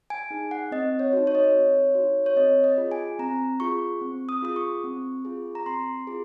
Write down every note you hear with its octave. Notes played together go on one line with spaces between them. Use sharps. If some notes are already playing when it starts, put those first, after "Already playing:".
G#5
D#4 G#4
F#5
C4 D#5
C#5
D#4 F#4
C#5
D#5
C#5
C4
D#4 F#4
C#5
C4 D#5
D#5
F4 G#4
G#5
C4 A#5
F4 G#4 C#6
C4
D#6
F4 G#4 D#6
C#6
C4
F4 G#4
A#5
C4 C6
F4 G#4